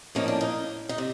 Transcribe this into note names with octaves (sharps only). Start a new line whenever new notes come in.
A2 F3 A#3 C#4 D#4
D4
D#4
D#4
C3